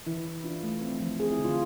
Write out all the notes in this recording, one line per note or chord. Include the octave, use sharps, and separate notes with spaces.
E3 E4
E3
D4 F4
A3
C4
F3
C4 G#4
E4
D3
F4